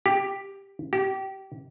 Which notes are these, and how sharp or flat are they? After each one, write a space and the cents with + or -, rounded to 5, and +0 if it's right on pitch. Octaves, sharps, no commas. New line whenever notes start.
G4 +5
G4 -25